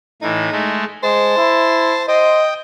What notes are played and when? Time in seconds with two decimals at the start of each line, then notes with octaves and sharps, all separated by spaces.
0.22 A2 E3 D#4
0.52 G#3 A3
1.03 G#3 C5 A5
1.37 E4
2.08 C5 D#5 G5 D#6